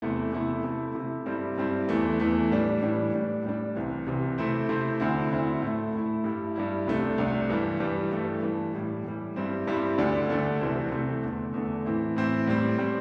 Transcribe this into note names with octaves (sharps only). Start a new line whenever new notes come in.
E2 C3 A3 E4
E2 C3 A3 E4
C3 A3 E4
C3 A3 E4
G2 G3 C4 E4
G2 G3 C4 E4
E2 E3 A3
E2 E3 A3
A2 E3 G3 D4
A2 E3 G3 D4
A2 G3 D4
A2 G3 D4
C2 C3 E3
C2 C3 E3
C3 A3 C4 E4
C3 A3 C4 E4
D2 D3 C4 E4
D2 D3 C4 E4
A2 A3 E4
A2 A3 E4
G2 G3 E4
G2 G3 E4
C2 C3 A3 D4
C2 C3 A3 D4
G2 E3 G3
G2 E3 G3
G2 E3 A3
G2 E3 A3
A2 E3 G3
A2 E3 G3
G2 G3 C4 E4
G2 G3 C4 E4
D2 D3 A3 D4
D2 D3 A3 D4
C2 C3 E3 A3 C4
C2 C3 E3 A3 C4
E2 D3 A3
E2 D3 A3
A2 E3 C4 E4
A2 E3 C4 E4
A2 G3 C4
A2 G3 C4